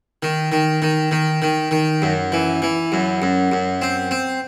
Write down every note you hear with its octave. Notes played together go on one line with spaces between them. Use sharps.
D#3
D#3
D#3
D#3
D#3
D#3
F#2
E3
E3
F#2
F#2
F#2
C4
C4